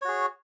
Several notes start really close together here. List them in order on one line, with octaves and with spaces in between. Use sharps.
C#5 F#4 G#4